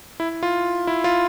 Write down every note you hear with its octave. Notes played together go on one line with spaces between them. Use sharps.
E4
F4
E4
F4